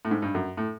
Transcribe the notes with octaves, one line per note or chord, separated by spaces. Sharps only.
A2
G#2
G2
F#2
A2